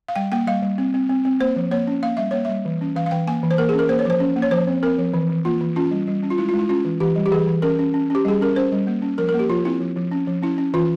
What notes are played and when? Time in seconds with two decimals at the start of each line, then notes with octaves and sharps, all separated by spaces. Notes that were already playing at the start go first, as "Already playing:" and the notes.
0.09 F5
0.16 G3 G5
0.32 A#3 G5
0.47 G3 F5
0.63 G3
0.78 C4
0.94 C4
1.09 C4
1.25 C4
1.40 A#3 C5
1.56 F3
1.71 A#3 C#5
1.87 C#4
2.03 A#3 F5
2.17 G3 E5
2.31 A#3 C#5
2.45 G3 E5
2.65 E3
2.81 C#4
2.96 E3 F5
3.06 F5
3.11 E3 G5
3.27 A#3 G#5
3.43 E3
3.51 C5
3.58 A#3 A#4
3.69 G#4
3.73 C#4
3.79 A#4
3.89 A#3 C5
3.99 C#5
4.05 F3 C5
4.20 C#4
4.36 A#3
4.42 C#5
4.51 F3 C5
4.67 C4
4.83 C4 A#4
4.98 F3
5.14 E3
5.29 E3
5.45 A#3 F4
5.61 E3
5.76 C#4 F4
5.91 G3
6.07 G3
6.23 C#4
6.30 F4
6.38 G#3 E4
6.49 F4
6.54 G#3
6.59 E4
6.69 C#4 F4
6.85 E3
7.00 E3 G4
7.16 G3
7.26 G4
7.31 E3 G#4
7.48 E3
7.62 C#4 A#4
7.79 C#4
7.94 C#4
8.10 C#4 G4
8.25 G3 G#4
8.41 C#4 A#4
8.56 C#4 C5
8.72 G3
8.87 A#3
9.02 C#4
9.18 F3 A#4
9.29 A#4
9.34 A#3
9.39 G4
9.49 F3 F4
9.65 C4 E4
9.80 F3
9.97 F3
10.11 C#4
10.27 F3
10.43 C#4 E4
10.58 C#4
10.74 E3 F4